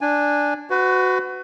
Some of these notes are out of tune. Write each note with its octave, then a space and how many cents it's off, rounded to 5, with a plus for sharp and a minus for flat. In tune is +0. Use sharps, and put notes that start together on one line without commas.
D4 +0 G#5 -10
F#4 +0 B4 +35